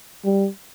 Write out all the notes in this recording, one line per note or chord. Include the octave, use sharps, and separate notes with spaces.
G3